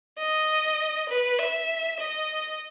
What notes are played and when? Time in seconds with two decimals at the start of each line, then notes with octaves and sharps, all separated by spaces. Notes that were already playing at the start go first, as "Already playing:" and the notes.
0.18 D#5
1.09 B4
1.39 E5
2.00 D#5